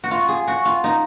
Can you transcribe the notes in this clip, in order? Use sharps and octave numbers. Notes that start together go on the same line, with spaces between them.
F#4
F4
G#4
F#4
F4
D#4